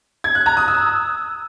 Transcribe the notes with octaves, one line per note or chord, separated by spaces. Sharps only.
G#6
F#6
A#5
D#6
E6